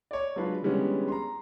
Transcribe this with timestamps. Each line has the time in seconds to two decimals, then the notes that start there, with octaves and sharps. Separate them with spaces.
0.11 C#5 D5
0.36 F#3 G#3 D4 F4 B4
0.62 D3 E3 G3 G#3 B3 C#4
1.08 A#5 C6